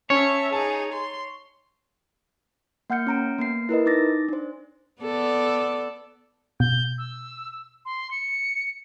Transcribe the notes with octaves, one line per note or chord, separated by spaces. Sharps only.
C#4 C#5 E5 A5
D#4 G#4 A5
C6
A#3 F#5 F6 G6 C#7
C#4 A#5 D7
A#3 B3 C7
E4 A#4 B4 D#5
D#4 D6 A6 A#6
D4 C5
B3 A4 D5
B2 G6
E6
C6
C#7